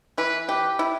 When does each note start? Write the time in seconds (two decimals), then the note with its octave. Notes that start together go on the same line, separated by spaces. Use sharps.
0.18 E3 B4
0.49 G4 B4
0.79 E4